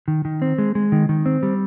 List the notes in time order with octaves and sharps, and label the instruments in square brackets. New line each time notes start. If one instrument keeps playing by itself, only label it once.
[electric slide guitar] D#3
D#3
C4
G#3
G#3
D#3
D#3
C4
G3